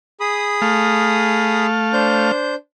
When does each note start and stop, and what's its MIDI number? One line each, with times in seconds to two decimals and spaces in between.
0.20 1.66 68
0.20 1.66 83
0.20 1.66 87
0.62 2.32 57
0.62 2.32 77
1.93 2.55 62
1.93 2.55 72
1.93 2.55 91